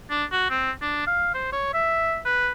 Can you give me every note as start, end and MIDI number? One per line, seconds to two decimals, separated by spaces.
0.10 0.24 62
0.32 0.47 66
0.50 0.71 60
0.82 1.05 62
1.07 1.32 77
1.34 1.50 72
1.53 1.72 73
1.74 2.19 76
2.25 2.52 71